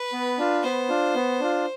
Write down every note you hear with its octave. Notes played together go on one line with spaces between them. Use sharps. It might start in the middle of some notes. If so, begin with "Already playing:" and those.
Already playing: B4
B3
D4 F4
B3 C5
D4 F4
B3
D4 F4